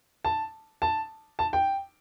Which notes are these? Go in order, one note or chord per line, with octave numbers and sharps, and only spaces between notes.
A5
A5
A5
G5